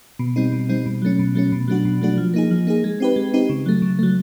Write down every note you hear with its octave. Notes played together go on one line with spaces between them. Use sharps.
B2
G3 C4 D#4
B2
G3 C4 D#4
B2
F#3 A3 C#4
B2
F#3 A3 C#4
B2
F#3 A3 D4 F#4
B2
F#3 A3 D4 F#4
F3
A#3 D#4 G#4
F3
A#3 D#4 G#4
G#3
C4 D#4 G4 B4
G#3
C4 D#4 G4 B4
C#3
F#3 A3
C#3
F#3 A3